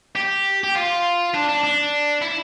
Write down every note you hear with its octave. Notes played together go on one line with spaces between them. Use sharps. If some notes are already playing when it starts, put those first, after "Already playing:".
G4
G4
F4
D4
D4
D4
E4